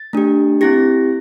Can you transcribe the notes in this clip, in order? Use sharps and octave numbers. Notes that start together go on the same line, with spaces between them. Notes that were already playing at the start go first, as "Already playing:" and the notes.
Already playing: A6
A3 D4 G4
C4 E4 G4 A#6